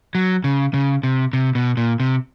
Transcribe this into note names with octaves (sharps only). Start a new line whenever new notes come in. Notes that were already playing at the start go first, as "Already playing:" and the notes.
F#3
C#3
C#3
C3
C3
B2
A#2
C3